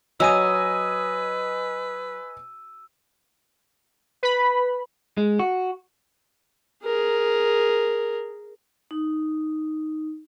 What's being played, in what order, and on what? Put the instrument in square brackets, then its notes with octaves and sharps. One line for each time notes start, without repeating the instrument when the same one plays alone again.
[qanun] F#3 [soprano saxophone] B4 [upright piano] D#5 G#5 D#6 [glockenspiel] E6 D#7
[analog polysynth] B4 B5
[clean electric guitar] G#3
F#4
[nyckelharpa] G#4 A#4
[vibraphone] D#4